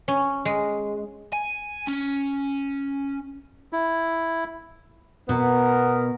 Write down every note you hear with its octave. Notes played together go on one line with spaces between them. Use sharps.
C#4
G#3
G#5
C#4
E4
B2 B3 A#4